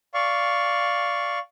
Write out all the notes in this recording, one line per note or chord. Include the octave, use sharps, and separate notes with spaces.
D5 F5 C#6